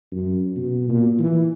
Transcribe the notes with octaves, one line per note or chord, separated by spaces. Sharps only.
F#2
B2
A#2
E3